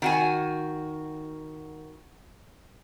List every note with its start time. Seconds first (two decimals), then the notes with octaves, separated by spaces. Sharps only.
0.02 D#3 F#4 G#5